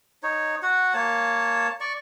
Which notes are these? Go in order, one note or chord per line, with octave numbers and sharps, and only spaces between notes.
D#4 C#5
F#4 F#5
A#3 C#5 A5
D5 C#6